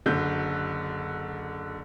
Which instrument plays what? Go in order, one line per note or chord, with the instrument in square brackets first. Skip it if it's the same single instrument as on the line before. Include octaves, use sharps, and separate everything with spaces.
[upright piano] F#1 D3 G6